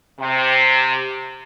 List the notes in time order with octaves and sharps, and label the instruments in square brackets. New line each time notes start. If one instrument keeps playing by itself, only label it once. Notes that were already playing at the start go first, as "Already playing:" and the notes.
[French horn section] C3